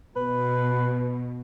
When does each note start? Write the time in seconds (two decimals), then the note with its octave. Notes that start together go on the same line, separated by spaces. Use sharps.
0.16 B2 B4